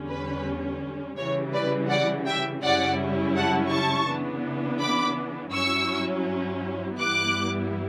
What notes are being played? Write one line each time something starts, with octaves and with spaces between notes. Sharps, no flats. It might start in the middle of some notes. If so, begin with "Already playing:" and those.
Already playing: E2 D3 G3 C#4
B4
C#3 E3 G3 C#5
B4 D5
D5 F#5
E5 G5
F#2 C#3 G3 C#4 E4 D5 F#5
F#5 A5
A5 C#6
C#3 E3 B3 D4
B5 D6
G2 F#3 C#4 E4 C#6 E6
G2 E3 G3 B3 E4 D6 F#6